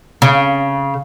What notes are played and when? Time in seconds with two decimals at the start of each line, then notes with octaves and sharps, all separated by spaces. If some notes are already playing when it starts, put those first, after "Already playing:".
0.22 C#3